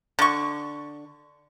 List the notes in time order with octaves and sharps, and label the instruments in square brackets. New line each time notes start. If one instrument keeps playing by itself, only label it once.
[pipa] D3 C#6